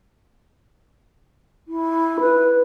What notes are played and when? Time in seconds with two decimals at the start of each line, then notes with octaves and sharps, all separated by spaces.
1.68 E4
2.20 B4